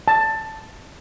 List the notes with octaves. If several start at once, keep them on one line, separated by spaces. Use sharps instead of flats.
A5